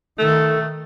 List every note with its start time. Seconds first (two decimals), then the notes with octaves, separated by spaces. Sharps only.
0.19 D#3 A3 A4